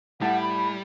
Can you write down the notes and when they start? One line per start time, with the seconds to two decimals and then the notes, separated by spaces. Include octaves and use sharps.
0.21 A2 G3 F#5 A5
0.42 B5